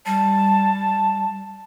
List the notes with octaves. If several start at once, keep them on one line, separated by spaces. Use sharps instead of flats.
G3 A5